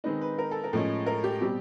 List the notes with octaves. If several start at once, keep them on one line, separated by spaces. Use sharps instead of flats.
D#3 G#3 C4 D#4 B4
B4
A#4
A4
A#4
A2 F3 G#3 C#4
A#4
G4
B2 G3 C4 G4